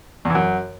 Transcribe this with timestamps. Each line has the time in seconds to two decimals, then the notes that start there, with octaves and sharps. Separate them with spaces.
0.25 E2
0.30 E3
0.35 F#2